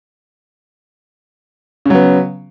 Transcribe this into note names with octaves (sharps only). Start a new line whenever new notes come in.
C#3 F#3 B3